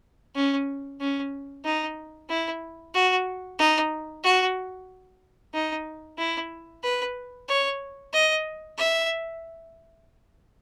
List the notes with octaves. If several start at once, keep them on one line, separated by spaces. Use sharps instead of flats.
C#4
C#4
D#4
E4
F#4
D#4
F#4
D#4
E4
B4
C#5
D#5
E5